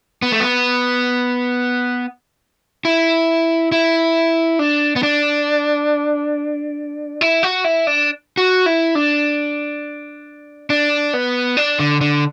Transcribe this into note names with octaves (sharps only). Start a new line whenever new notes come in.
B3
A3
B3
E4
E4
D4
B3
D4
E4
F#4
E4
D4
F#4
E4
D4
D4
B3
D4
D3
D3